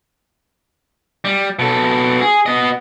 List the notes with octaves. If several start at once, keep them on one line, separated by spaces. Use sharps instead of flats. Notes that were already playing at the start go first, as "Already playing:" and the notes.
G3
B2 A4
G#4
B3 D#5